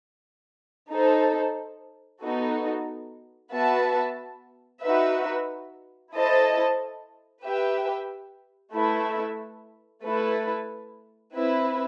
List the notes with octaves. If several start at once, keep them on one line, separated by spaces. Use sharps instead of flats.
D#4 A4 C5
B3 D#4 F#4 A4
B3 F#4 B4 E5 A5
D#4 F#4 B4 E5
E4 A4 C5 D#5 A5
G4 B4 E5 G5
A3 E4 B4 E5
A3 E4 B4
C4 E4 B4 E5